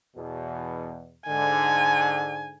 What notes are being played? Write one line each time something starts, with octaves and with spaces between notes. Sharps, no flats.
E2 B2
G#2 D3 G#5